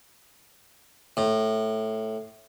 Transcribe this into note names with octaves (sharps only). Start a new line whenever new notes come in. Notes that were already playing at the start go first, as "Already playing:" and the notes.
A2